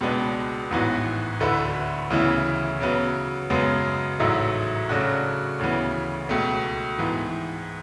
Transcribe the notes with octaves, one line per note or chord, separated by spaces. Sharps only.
C#2 B2 G#3 B3 D4
A1 G#2 E3 B3 F#4
D2 D3 A3 E4 B4
D2 C#3 E3 B3 E4
C#3 F#3 B3
F#2 C#3 G#3 B3
A1 G#2 F#3 A3 E4
C#3 F#3 A3 D4 F#4
D2 C#3 E3 B3
C#2 B2 A3
G#2 E3 B3